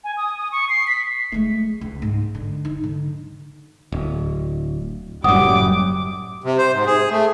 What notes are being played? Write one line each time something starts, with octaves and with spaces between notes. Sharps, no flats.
G#5
D#6
D#6
C#6
C7
B6
G#3 A3
C#2
G#2
D3
D#4
D3
D1
F#1 F#2 A2 F#3 G3 F#5 D6 D#6
C3
C5
G#2
G#4
A3